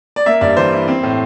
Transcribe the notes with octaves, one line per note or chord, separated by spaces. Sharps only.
D5
A#3 E5
G2 D5
E3 C5
E4
C4
A2